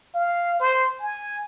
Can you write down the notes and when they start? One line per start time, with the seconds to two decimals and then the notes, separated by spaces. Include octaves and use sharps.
0.15 F5
0.60 C5
1.00 G#5